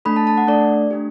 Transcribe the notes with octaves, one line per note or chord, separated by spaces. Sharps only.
A3 D4 A4 B5
A5
A5
F#5
A3 D4 A4 D5
A3 D4 G4